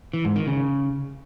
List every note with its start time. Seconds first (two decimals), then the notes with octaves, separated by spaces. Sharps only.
0.13 E3
0.25 G#2
0.36 D#3
0.47 C#3